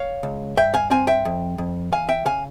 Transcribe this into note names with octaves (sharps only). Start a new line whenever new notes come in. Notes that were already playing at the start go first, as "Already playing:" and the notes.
Already playing: C#5 F5
C#2
G2 E5 G5
F5 G#5
C4 F5 G#5
E5 G5
F2
F2
E2 F5 G#5
E5 G5
C#3 F5 G#5